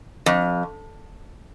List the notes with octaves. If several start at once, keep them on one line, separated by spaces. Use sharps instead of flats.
F2